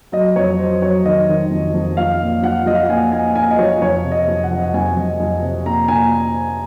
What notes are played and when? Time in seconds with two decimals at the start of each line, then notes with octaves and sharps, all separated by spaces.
0.12 F#3 D#5
0.36 F2 C#5
0.59 F#3 C5
0.82 F#3 C#5
1.04 D#3 D#5
1.29 D#3
1.51 F2
1.74 F2
1.97 F3 F5
2.21 A#2
2.43 F3 F#5
2.66 F3 D#5
2.75 F5
2.82 F#5
2.89 A#2 G#5
3.12 A#2 G#5
3.35 A#2 G#5
3.51 D#5
3.58 F3 C#5
3.82 F2 C#5
4.04 C3
4.12 D#5
4.28 F2
4.43 F#5
4.51 F2
4.62 F#5
4.74 F2 G#5
4.96 F2
5.20 F2
5.42 C3
5.66 A#2 A#5
5.88 A#2 G#5